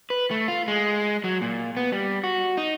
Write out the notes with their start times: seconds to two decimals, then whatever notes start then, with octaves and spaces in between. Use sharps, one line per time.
0.10 B4
0.31 A3
0.48 F4
0.68 G#3
1.24 F#3
1.42 A#2
1.77 B3
1.93 G3
2.24 F#4
2.57 D#4